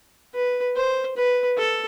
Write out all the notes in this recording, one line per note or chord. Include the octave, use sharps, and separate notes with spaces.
B4
C5
B4
A4